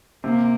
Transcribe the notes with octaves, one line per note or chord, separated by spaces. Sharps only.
C3 A#3